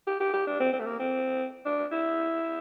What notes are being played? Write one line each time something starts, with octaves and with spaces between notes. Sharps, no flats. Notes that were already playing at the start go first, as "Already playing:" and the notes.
G4
G4
G4
D4
C4
C4
A3
A#3
C4
D4
E4